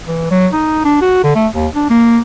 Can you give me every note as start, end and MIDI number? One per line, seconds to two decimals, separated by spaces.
0.08 0.27 52
0.31 0.48 54
0.53 0.80 63
0.85 1.00 62
1.01 1.21 66
1.24 1.35 50
1.35 1.47 57
1.54 1.67 39
1.75 1.87 62
1.90 2.19 58